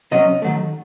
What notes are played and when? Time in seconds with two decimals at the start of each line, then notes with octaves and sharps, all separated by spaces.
0.11 C3 F#3 C#4 D#5
0.42 D#3 F#3 A3